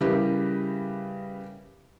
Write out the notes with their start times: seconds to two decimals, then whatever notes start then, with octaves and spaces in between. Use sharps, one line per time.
0.01 C#3 G3 E4 G4 A#4 B4